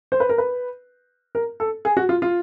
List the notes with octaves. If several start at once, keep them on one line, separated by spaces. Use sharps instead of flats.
C5
B4
A#4
B4
A#4
A4
G#4
F#4
F4
F4